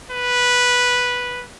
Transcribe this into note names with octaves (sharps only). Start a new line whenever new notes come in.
B4